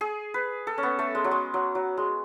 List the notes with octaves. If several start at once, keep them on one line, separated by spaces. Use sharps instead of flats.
G#4
B4
A4
C#4
B3
A3
G#3
F#3
G#3
F#3
F#3
G#3